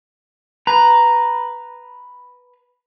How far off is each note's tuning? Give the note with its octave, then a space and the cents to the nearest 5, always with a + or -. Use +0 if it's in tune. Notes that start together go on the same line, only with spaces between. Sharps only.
B4 +0 A#5 +0